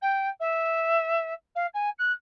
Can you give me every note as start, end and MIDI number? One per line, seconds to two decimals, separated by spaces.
0.02 0.29 79
0.40 1.33 76
1.55 1.66 77
1.74 1.89 80
1.98 2.12 90